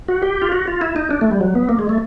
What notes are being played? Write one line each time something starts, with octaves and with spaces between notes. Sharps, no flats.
F#4
G4
F4
F#4
F4
E4
D#4
D4
A3
G3
F#3
B3
A#3
G#3
A3